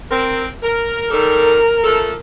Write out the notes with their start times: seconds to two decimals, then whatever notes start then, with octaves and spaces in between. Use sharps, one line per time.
0.11 C4 A#4
0.63 A#4
1.11 D#3 G3 A4 A#4
1.84 F3 A3 A4